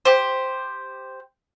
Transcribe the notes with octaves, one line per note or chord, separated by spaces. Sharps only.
G4 C5